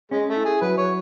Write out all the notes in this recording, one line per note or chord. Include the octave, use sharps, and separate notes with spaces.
G#3 C#4
A3
E4
G#4
F#3 B4
C#5